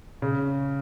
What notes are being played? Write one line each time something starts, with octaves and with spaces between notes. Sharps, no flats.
C#3